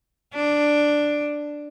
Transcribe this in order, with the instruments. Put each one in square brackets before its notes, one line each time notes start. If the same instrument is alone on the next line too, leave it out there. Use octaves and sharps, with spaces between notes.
[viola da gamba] D4